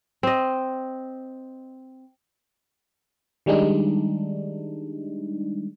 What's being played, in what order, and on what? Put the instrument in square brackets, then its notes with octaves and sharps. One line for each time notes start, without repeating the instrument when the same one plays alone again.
[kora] C4 D#5
[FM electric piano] D#3 G3 G#3 D4 D#4